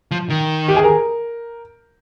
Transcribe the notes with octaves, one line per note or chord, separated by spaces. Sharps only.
F3
D#3
G4
G#4
A#4